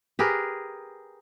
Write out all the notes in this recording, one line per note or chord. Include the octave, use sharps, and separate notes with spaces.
G4 G#4 A#4 B4